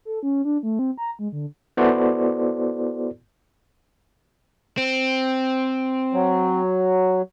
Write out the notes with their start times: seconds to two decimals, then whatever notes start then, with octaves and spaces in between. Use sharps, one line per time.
0.05 A4
0.23 C#4
0.45 D4
0.63 A3
0.79 C4
0.98 A#5
1.19 G#3
1.32 D3
1.77 B3 E4 F#4 A4 C5 D5
4.78 C4
6.13 F#3